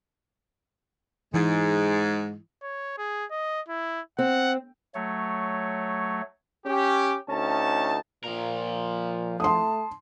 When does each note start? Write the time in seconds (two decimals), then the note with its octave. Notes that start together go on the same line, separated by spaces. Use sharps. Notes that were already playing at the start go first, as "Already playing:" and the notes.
1.34 G#2 E3 G#3
2.62 C#5
2.98 G#4
3.31 D#5
3.68 E4
4.19 C4 F#5
4.95 F#3 A3 C#5
6.66 C#4 G4
7.29 D2 C#4 D#4 A5
8.24 A#2 F3 A#4
9.40 A3 A5 C6 D#6